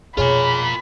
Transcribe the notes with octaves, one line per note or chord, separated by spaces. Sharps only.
F2 B2 F4 G#4 A#4 C#5 G#5 B5